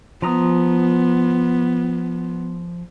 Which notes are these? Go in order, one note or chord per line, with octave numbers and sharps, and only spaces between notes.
F3 B3 A#5 D#6